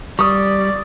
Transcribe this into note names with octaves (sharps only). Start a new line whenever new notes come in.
G3 D5 C#6 D#6